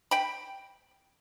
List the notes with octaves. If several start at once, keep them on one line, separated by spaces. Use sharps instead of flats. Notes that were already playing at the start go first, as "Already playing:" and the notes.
G5 B5